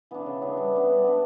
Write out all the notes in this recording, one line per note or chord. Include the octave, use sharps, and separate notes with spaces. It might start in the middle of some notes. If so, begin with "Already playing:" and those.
E3 B3 D4
C#3
E3 B3 D4
G3
B3 D4
G3
B3 D4